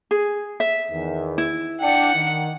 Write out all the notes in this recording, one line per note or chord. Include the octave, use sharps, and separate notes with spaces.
G#4
E5
E2 D#3
E4
D4 F#5 G5 C#7
D#3